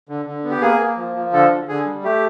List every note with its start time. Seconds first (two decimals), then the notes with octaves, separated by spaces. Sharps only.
0.09 D3
0.26 D3
0.44 B3
0.51 G4
0.61 A#3 G#4
0.79 A#3
0.97 F3
1.15 F3
1.33 D3 A4
1.51 D3
1.68 D3 G#4
1.85 G3
2.04 A3 G4